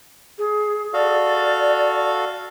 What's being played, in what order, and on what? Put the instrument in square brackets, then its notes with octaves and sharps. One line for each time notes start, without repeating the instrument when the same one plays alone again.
[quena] G#4
[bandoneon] F#4 A4 F5 [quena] D5